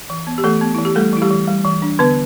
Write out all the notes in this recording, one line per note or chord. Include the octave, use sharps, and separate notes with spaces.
E3
B3
G4
E3 A3 A4
B3
E3 E4
G4
G3 A3 A4
E3 E4
G3 G4
E3
G3
E3
D4
D3 B3 B4